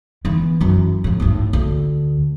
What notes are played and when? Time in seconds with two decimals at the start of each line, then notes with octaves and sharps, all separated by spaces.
0.25 E3 B3
0.60 F#2 E3
1.04 A2 F3
1.20 G#1 A2
1.53 D2